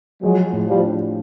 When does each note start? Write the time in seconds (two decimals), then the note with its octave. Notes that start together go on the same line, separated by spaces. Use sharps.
0.22 F3 F#3 G#3
0.53 A2
0.67 F3 G3
0.83 D4